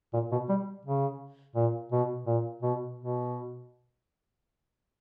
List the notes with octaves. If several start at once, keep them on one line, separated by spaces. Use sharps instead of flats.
A#2
B2
G3
C#3
A#2
B2
A#2
B2
B2